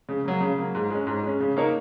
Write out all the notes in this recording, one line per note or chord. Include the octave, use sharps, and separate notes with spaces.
C#3
F#3 A#3
C#3
F#3 A#3
G#2
G#3 C#4
G#2
G#3 C#4
C#3
A#3 D#4 A#4 C#5